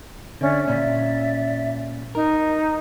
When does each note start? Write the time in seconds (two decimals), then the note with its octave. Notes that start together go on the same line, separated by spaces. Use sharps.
0.41 D3 C#4 D5 E5
0.68 A#2 C#4 D5 E5
2.15 D#4 A#4